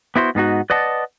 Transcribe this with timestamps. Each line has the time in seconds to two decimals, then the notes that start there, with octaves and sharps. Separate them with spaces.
0.16 B3 E4 F#4 C5
0.35 G#2 B3 D#4 F#4
0.70 B4 D5 D#5 F#5 A5